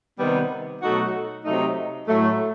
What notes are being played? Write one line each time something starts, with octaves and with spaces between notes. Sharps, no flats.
C3 D#3 G3 B3
B2 F#3 A3 D#4 F#4
C3 F#3 A3 D#4
A2 F#3 A3